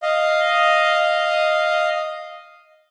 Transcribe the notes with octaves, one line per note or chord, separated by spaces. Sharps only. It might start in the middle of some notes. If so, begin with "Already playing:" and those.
D#5 F5